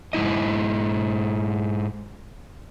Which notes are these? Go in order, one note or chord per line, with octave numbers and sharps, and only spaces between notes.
G#2 G#3 E4 D#5